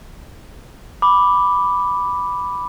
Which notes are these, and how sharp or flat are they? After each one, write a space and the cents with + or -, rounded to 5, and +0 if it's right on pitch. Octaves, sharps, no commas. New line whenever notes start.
B5 +0 D6 +0